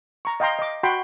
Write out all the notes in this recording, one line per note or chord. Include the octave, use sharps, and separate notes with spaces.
A#5 C#6
D#5 F5 G5 A#5 C6
D#5 D6
F#4 G5 B5 C6